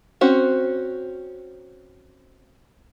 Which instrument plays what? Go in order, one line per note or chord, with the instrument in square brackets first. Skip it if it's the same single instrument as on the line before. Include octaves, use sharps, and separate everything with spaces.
[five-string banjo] C4 C#4 F#4 C5